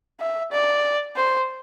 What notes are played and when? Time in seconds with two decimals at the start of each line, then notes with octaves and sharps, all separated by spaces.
0.20 E5
0.51 D5
1.16 C5